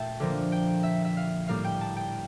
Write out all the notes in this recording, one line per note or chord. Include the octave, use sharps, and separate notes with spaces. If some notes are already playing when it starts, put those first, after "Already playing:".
Already playing: A#2 A3 E5 G5 A5
D3 F3 A#3
G5
E5
E5
F5
A2 G3 A#3 F5
G5
A5
G5